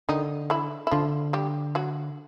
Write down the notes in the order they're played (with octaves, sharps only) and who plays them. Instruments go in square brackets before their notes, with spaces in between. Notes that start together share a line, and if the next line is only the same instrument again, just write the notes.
[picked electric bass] D3 [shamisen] D#3 D#4
[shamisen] E3 E4
E4
[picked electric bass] D3 [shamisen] F3 F4
[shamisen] G3 G4
F#3 F#4